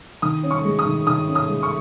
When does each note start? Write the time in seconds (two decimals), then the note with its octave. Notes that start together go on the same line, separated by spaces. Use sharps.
0.22 D#3 D#6
0.43 C#4
0.51 C#6
0.65 G#3
0.79 D#6
0.86 D#3
1.07 D#3 D#6
1.28 C#4
1.35 D#6
1.49 G#3
1.63 C#6